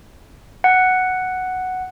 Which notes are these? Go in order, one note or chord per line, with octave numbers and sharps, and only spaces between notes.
F#5